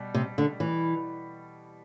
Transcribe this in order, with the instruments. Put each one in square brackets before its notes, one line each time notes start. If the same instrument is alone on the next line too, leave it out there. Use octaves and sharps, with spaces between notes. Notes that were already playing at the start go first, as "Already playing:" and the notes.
Already playing: [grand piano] B2 G3
[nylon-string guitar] C3
D3
E3